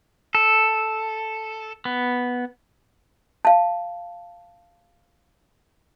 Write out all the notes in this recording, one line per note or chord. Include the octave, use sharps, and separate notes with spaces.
A4
B3
F5 A5